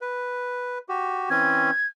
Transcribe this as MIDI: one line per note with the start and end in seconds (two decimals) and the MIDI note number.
0.01 0.78 71
0.89 1.30 66
0.89 1.30 67
1.30 1.71 52
1.30 1.71 60
1.30 1.71 61
1.30 1.87 92